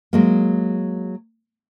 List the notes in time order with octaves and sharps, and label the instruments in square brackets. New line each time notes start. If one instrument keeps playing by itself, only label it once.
[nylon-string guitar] F#3 G#3 A#3